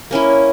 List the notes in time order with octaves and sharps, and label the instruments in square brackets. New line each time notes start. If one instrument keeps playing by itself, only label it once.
[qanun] A#3 C#4 E4